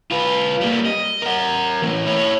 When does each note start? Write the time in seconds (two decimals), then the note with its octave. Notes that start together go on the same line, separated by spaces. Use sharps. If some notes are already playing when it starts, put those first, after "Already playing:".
0.11 F4 B4
0.61 G3 A#3
0.86 D#5
1.22 A#4 F#5
1.82 E3 A3
2.06 E4 C#5